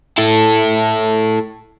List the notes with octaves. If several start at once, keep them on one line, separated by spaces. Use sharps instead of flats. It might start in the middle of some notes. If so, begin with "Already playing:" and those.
E4 A4